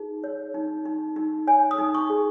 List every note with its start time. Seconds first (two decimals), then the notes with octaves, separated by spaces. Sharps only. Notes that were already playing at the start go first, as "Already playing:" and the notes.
Already playing: D#4 G#4
0.24 C#5
0.54 D#4
0.86 D#4
1.16 D#4
1.47 C#5 G#5
1.71 D#6
1.78 D#4
1.94 C#6
2.10 G#4